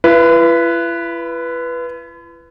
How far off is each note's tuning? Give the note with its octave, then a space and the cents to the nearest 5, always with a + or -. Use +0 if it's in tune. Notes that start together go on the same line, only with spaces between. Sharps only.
E4 +45 B4 -5